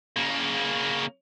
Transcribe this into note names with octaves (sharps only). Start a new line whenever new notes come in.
C#3 A#3